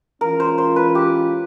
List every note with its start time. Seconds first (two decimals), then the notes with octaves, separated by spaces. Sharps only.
0.21 E3 G#3 C#4 F4 A#4
0.40 C5
0.58 C5
0.76 B4
0.95 G4